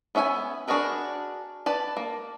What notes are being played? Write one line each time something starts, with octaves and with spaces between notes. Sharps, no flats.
B3 C#4 E5 F#5 G#5
D4 F#4 G#4 A#4 B4
B4 D5 A5
A#3